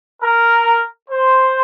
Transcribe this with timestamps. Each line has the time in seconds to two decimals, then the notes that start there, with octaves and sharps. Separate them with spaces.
0.22 A#4
1.09 C5